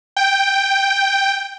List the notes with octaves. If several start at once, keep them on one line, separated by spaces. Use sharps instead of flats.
G5